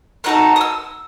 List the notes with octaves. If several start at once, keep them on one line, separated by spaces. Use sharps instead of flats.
A3 D#4 F#4 A4 F#6
D#6
E6